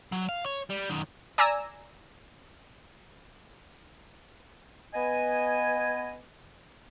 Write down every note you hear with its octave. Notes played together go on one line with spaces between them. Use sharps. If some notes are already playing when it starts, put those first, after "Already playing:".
F#3
F5
C#5
G3
F#2 D#3
D5 G#5 A#5 E6 A#6
B3 D#5 G#5